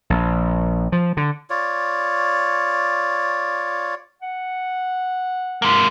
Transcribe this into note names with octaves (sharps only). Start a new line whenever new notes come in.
A#1
F3
D3
F4 C#5 D5
F#5
G#3 A#3